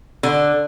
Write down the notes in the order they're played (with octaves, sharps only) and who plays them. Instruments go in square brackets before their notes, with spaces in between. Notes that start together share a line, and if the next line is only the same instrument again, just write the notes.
[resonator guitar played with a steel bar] D3